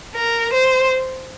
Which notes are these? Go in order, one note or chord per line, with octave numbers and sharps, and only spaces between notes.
A#4
C5